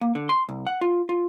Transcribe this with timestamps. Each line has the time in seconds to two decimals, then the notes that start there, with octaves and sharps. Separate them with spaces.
0.01 A#3
0.15 D3
0.29 C6
0.49 C2
0.67 F#5
0.81 F4
1.09 F4